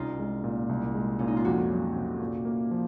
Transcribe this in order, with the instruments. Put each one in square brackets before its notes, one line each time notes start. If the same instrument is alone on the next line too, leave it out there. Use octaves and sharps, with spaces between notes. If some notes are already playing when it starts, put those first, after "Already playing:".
Already playing: [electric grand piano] C2 [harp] C#4 D#4 F4
[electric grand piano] G#3
A#2
C2
G#3
[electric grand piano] A#2 [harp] C#4
[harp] D#4
F4
[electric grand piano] F2 [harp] F#4
[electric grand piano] F#3
C3
A#2
A#3
F3